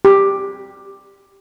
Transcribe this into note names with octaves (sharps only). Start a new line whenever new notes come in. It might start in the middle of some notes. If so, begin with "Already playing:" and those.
G4